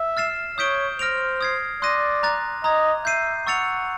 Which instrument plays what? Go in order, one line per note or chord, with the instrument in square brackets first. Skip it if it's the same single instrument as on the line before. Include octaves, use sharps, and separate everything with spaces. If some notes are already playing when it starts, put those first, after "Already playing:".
Already playing: [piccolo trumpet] E5
[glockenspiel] F6 A6 C7 E7
[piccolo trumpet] C#5 [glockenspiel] D#6 G6 B6 D7 G7
[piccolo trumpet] C5 [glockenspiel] F6 A#6 D7 F7
[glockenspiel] D#6 G#6 C7
[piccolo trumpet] D5 [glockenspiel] C6 D#6 F#6 A#6 D#7
[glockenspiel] A#5 D6 F#6 A6
[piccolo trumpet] D#5 [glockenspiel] A#5 D#6 G#6
[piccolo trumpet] E5 [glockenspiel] G6 C7 D#7
[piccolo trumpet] F#5 [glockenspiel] C#6 E6 A6 C#7 F7